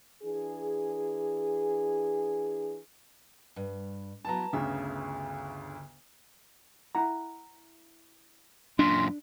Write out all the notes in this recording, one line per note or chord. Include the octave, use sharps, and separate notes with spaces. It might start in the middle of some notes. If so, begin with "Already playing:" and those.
E3 D4 G#4
G2
F#3 B3 E4 A5 A#5
G1 D2 C#3 E5
E4 F#5 A#5
F#2 A#2 D4 C6